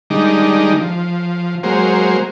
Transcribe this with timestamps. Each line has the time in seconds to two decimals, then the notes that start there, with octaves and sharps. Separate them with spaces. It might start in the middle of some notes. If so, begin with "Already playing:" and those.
0.10 D#3 G3 G#3 D4 D#4
0.81 F3
1.63 F#3 G#3 A#3 C5